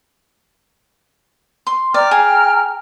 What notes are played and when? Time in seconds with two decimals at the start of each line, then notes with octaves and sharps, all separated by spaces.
1.67 C6
1.94 D5 G5 A#5 F6
2.11 G#4